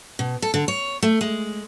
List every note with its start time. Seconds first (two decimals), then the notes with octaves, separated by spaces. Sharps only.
0.19 B2
0.42 A4
0.54 D3
0.68 C#5
1.03 A3
1.21 G#3